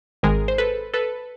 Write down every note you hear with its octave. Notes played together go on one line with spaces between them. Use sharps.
G#1 G#2 D#3 G#3 G#4 A#4
C5
A4 B4
A4 B4